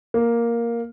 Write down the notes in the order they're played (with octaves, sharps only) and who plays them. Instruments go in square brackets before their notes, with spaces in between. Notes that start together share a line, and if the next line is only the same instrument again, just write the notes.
[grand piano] A#3